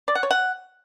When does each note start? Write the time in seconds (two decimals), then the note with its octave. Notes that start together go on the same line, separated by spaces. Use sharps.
0.08 D5
0.15 F#5
0.23 C#5
0.31 F#5